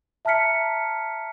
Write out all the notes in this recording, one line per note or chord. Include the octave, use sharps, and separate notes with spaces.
E5 A5 A#5 F6 B6 C#7